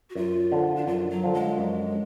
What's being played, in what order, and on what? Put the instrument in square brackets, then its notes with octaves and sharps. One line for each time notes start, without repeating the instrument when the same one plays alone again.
[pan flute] F#4
[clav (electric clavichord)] F#2 [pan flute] F4
[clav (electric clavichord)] D3 F3
[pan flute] D4
[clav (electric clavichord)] F#2 [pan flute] F4
[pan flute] F#3
[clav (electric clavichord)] D3 F3
[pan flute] G#3
[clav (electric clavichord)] F#2